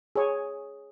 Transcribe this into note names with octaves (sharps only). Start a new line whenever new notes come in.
G#4 C#5